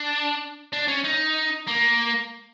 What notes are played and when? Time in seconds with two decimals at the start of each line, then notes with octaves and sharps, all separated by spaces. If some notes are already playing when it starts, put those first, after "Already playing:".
Already playing: D4
0.73 D4
0.88 C#4
1.05 D#4
1.68 A#3